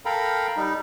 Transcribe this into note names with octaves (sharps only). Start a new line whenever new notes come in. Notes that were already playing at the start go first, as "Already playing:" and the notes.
A4 A#4 F5 G5 A#5 B5
G3 D#4